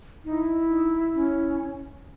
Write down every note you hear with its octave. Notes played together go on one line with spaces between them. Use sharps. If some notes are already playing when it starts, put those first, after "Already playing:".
D#4 E4
D#4
C#4